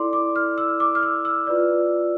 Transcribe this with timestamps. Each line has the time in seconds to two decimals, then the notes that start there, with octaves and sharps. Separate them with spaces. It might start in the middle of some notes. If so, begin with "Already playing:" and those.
Already playing: E4 A4 D5 C6 D6
0.13 D6
0.36 F6
0.58 E6
0.80 D6
0.95 F6
1.03 E6
1.25 E6
1.47 F4 B4 D5